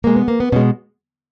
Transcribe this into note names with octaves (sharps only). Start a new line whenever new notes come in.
B2 G#3 A#3
B3
A#3
B3
B2 G#3 C#4